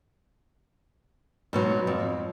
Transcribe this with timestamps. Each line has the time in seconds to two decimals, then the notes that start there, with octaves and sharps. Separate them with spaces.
1.53 G#2 B2 F#3
1.87 F2